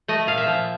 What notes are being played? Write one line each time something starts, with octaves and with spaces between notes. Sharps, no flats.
A3 D#5
A#2 F5
E5
F3